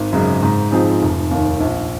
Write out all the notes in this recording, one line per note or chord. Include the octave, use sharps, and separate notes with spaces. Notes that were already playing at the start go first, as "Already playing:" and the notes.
Already playing: G#1
F#2 C#3 G#3
G#2
F3 C4 D#4 G#4
F1
D#2 D#3
A#1